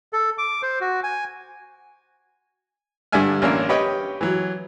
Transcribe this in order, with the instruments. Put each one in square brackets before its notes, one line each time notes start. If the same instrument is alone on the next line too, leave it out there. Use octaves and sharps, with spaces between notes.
[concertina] A4
D6
C5
F#4
G#5
[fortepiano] G2 D3 D4 E5 G#5 F6
A1 A#3 C#4 D4 A#4 E6
G4 B4 C#5 D#5 G5
E3 F#3